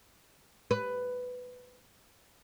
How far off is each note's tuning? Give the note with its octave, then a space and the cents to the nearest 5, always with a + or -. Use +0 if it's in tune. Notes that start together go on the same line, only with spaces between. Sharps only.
B4 +10